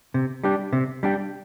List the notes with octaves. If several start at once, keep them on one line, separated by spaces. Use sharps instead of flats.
C3
G3 D4 G4
C3
G3 D4 G4